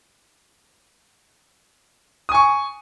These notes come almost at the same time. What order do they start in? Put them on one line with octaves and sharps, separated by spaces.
D#6 G#5 C#6